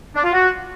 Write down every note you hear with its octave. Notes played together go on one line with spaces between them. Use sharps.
D4
F4
F#4